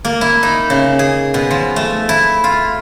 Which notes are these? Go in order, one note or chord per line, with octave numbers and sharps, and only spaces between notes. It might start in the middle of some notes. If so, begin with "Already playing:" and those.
A#3
E4
D#4
C#3
G#4
B2
F3
A3
E4
F4